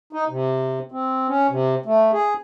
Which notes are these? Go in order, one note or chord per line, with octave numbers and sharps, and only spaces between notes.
D#4
C3
C4
C#4
C3
A3
G#4